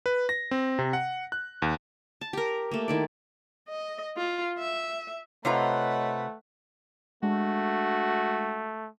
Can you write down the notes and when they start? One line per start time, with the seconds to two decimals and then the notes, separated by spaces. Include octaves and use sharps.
0.06 B4
0.29 A#6
0.51 C4
0.79 C3
0.93 F#5
1.32 F#6
1.62 D#2
2.21 A5
2.33 G4 A#4
2.71 A3 A#3
2.88 D#3 E4 D5
3.68 D#5
4.17 F4
4.59 E5
5.45 C3 A3 F4 B4 C#5 D#5 F#5 A#5
7.23 G#3 A3 D4 F#4